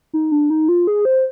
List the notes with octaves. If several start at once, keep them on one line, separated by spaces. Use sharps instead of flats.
D#4
D4
D#4
F4
G#4
C5